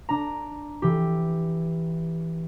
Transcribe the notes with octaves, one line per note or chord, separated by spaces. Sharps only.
D4 A#5
E3 G4